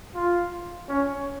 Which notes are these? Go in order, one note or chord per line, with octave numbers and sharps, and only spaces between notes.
F4
C#4